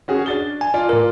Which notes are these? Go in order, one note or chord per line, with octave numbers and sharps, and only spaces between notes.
C#4 F#4 G#4
D4 A6 G7
G#5 A5
F4 D5
A2 A#4